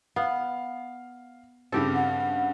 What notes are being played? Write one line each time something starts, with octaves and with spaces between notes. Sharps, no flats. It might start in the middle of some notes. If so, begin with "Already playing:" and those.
B3 F5
G2 C#3 C4 G4 A4
F#5